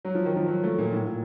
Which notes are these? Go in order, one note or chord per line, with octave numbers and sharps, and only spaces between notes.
F#3
F3
D#3
F3
F#3
A3
A#2
A2
A#2